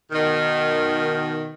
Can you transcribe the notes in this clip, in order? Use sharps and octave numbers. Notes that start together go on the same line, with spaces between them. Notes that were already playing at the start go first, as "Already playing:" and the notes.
B2 D#3